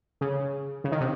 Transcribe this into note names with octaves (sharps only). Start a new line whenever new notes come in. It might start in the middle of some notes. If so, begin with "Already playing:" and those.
C#3
C#3
D#3
C3